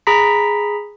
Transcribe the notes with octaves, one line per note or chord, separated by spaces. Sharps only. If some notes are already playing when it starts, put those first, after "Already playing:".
G#4 A#5 B5 B6